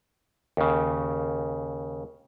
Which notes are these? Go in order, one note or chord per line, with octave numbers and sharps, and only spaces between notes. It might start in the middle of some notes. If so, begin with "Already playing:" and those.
D#2 C#3